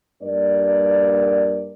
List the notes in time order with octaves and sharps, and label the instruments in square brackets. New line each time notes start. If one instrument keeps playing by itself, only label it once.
[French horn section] G2 A#3 A#4 D5